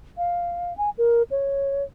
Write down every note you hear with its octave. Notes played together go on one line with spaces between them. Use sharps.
F5
G#5
A#4
C#5